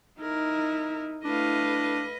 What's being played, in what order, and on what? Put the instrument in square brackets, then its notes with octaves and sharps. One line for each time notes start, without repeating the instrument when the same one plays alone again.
[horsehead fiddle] D#4 [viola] E4 A#4
[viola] A3 F5 [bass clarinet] D4 [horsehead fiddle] E4 [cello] B4 D#5